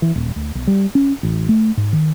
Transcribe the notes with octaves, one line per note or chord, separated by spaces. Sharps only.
E3
D#1
D2
B1
G3
C#4
A1
A3
G#2
D#3